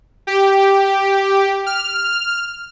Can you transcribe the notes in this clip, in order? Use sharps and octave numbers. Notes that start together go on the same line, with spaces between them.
G4
F6